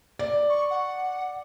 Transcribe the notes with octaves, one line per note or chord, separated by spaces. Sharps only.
D5
C#6
F#5